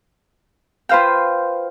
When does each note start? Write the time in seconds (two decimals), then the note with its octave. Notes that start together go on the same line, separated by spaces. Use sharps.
0.89 F4 B4 C5 F5 G5